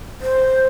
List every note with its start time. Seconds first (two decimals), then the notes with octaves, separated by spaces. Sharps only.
0.21 C5